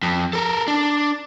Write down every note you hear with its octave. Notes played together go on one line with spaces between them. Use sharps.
F2
A4 A#4
D4